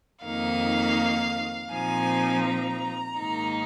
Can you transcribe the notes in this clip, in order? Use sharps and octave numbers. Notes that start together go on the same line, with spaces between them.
F2 D#3 A#3 D#4 F5
A#2 F3 C4 D#4 G#5
A#5
G#2 D#3 A#3 D#4